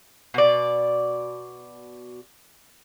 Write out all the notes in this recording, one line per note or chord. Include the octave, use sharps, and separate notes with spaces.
B2 D5